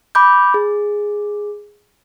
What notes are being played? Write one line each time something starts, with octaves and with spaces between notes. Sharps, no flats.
B5 D6 G6
G#4